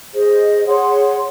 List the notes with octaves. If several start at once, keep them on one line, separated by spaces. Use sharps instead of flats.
G#4 C5 D#5
G#4 C#5 F#5 C6